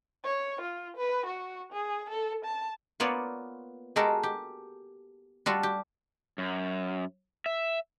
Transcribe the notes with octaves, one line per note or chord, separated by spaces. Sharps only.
C#5
F4
B4
F#4
G#4
A4
A5
A#3 B3 F4 C#5 D5
G#3 F#4 G4 A4 A#4
G4
G3 F4 F#4 A4
G4
F#2
E5